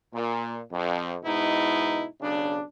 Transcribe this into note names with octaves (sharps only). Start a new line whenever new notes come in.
A#2
F2
G#2 B2 D#4 E4
B1 C#3 D4